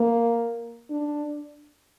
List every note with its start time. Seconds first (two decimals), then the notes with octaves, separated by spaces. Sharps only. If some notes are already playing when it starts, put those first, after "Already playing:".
Already playing: A#3
0.90 D4